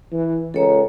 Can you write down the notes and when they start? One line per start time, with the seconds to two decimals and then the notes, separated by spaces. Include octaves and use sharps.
0.12 E3
0.54 C#2 A4 C#5 A#5